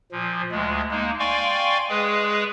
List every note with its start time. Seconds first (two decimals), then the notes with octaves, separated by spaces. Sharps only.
0.12 A#2 F3
0.51 D2 G#3
0.91 G#3 A#3 D#4
1.19 D5 F5 G5 G#5 C6 C#6
1.89 G#3 G#4 B4